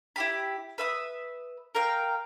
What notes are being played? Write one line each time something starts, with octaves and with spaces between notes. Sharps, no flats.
E4 G4 B5
B4 E5 D#6
A#4 F5 G5